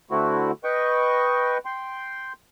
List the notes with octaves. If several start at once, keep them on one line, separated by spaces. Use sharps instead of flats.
D3 A3 C4 E4 F#4
B4 D#5 G5 C#6
G5 C6